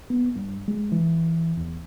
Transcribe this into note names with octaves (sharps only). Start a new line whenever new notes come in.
B3
G2
G#3
E3
E2